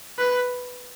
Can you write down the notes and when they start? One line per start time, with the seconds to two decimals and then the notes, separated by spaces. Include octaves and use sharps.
0.18 B4